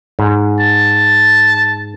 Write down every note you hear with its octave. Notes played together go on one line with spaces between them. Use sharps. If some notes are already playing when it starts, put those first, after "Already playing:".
G#2
A5